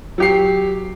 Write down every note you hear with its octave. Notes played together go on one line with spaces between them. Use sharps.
F#3 G4 C7